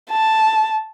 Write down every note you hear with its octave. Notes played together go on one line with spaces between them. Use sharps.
A5